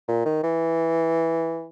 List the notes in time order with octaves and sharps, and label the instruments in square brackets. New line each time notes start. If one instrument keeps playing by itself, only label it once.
[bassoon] A#2
D#3
E3